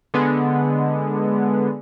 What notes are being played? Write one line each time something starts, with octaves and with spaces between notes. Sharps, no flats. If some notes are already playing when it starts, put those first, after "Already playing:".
D3 G#3 B3